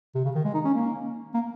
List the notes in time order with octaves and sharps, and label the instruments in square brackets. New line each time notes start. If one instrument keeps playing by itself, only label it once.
[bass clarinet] C3
C#3
D#3
G#3
D#4
C#4
A#3
A#3